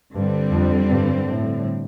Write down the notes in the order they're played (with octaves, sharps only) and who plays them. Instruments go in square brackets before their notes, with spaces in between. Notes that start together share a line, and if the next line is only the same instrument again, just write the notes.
[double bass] G2 [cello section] D3 G3 C4
[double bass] F2
G2
A2